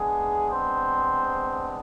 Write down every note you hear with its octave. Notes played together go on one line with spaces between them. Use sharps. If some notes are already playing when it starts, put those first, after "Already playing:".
Already playing: G#3 B3 D4 G#4
C4 C5